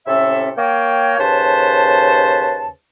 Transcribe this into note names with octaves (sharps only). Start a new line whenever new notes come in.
A2 C3 C#4 A4 E5
A#3 C#5 G5
D#2 C#3 B4 C5 A5